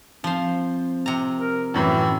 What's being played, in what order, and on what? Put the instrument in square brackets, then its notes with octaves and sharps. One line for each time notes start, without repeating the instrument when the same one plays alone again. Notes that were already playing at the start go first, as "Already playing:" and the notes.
[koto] F3 C5 [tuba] C4
[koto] C3 A#5
[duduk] A#4
[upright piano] F#2 A2 E3 [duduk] E4